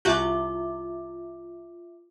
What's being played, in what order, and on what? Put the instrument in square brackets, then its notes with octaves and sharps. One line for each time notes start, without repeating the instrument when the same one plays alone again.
[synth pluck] C2 F#4 G6 [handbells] F4 E5 D6